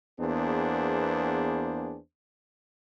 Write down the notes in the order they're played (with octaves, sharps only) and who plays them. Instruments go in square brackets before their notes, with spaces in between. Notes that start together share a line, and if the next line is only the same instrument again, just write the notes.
[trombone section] E2 A#3 B3 D4 G#4 C5